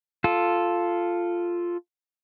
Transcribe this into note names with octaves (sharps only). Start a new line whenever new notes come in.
F4 A4